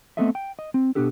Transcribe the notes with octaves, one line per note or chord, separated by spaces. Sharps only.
A3 B3 C4 A4 D#5 E5
G5
D#5
C4
B2 G#3 B3 D4 G4 A4